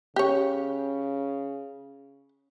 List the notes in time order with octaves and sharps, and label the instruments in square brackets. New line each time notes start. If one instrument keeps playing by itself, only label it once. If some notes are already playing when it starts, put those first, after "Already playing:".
[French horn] C#3 [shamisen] G4 C#5